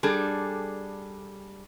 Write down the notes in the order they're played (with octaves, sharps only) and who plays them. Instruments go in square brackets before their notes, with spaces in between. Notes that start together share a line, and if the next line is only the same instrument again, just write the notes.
[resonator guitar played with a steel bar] G3 D4 G#4 A4